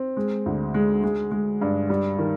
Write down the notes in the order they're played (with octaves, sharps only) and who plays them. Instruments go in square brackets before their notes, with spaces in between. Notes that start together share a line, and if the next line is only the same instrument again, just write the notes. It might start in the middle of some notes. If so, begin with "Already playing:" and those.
Already playing: [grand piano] C4
G#3
D2
G#3
G#3
G#3
G2
G3
D#3